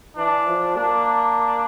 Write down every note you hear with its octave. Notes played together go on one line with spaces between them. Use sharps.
E3 D4
F3
A#3 D4